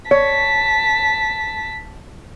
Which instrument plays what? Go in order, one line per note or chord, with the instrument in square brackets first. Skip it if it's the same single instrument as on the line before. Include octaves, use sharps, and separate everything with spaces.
[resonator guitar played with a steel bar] C#5 [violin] A5 B6